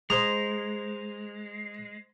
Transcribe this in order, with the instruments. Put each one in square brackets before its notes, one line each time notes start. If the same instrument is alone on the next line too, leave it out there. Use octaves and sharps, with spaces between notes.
[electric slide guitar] G#3 [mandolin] C5 D#6 [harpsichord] A#5